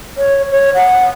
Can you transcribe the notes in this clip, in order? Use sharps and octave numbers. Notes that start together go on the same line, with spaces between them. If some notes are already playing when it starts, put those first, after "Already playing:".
C#5
C#5
F#5